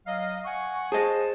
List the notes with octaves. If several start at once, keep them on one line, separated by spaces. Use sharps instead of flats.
F#3 D#5 F5
F#5 G#5 C#6
G#4 C5 D#5 A5